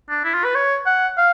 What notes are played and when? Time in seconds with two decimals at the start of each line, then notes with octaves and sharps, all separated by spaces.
0.09 D4
0.24 E4
0.34 F4
0.44 B4
0.55 C#5
0.86 F#5
1.17 F5